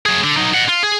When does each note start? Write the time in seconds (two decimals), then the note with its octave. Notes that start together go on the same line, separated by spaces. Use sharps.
0.06 F#3 G#4
0.24 D3
0.37 F#3 D#4
0.55 D#5 F#5
0.69 F4
0.83 G#4